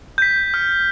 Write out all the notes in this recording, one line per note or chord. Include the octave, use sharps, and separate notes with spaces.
G6 B6
F6